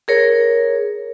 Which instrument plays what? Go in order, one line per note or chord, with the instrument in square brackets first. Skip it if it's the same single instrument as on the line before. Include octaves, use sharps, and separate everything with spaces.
[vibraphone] G#4 A#4 C#5